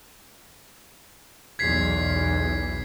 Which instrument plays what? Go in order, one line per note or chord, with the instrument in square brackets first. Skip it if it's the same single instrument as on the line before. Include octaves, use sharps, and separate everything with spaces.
[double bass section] B1 E2 [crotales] G#6 B6 C7